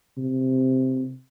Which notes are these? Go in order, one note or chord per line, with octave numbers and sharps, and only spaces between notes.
C3